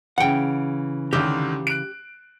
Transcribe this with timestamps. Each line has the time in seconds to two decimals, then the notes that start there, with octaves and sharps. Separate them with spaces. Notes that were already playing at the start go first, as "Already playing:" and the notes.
0.18 C#3 E3 F#5 G5
1.13 C#2 D3 D#3 G4
1.67 F#6 D7